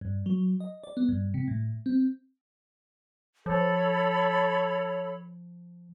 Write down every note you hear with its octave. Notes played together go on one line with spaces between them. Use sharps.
G2
F#3
D#5
D5
B3
G2
C3
A2
C4
F3 A4 C#5 B5